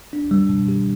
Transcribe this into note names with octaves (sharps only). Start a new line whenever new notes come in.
D4
G3
B2
G4